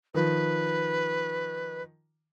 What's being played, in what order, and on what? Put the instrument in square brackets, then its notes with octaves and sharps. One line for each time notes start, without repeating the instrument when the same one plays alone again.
[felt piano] D#3 F3 [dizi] B4